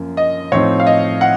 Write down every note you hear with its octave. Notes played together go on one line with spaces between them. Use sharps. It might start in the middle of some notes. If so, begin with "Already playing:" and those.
Already playing: F#2 F3 A#3
D#5
A2 F3 C4 D#4 C#5
F5
D#5
F#5